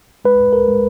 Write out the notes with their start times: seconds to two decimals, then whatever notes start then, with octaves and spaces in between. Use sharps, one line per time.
0.25 G#3 B4
0.53 A#4
0.68 G#3